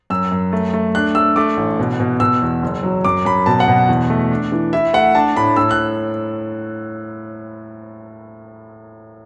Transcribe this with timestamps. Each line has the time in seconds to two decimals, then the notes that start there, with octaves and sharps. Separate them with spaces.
0.10 F#2 E6
0.32 F#2
0.52 A3
0.73 A3
0.95 D4 F#6
1.15 A3 E6
1.36 A3 D6
1.57 A1
1.79 B2
2.00 B2
2.20 B2 E6
2.42 E2
2.63 F#1
2.83 F#3
3.05 F#2 D6
3.25 F#2 B5
3.46 B2 A5
3.60 F#5
3.68 B2
3.89 E2
4.10 A3
4.31 D4
4.52 E3
4.73 E4 E5
4.93 A3 F#5
5.15 D4 A5
5.36 A2 B5
5.56 A2 E6
5.71 F#6